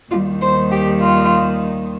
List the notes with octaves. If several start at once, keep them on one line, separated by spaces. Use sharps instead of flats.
D#2 D#3 G3 F4
C5
G4
F4